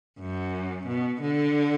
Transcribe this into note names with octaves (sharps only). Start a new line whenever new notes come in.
F#2
B2
D3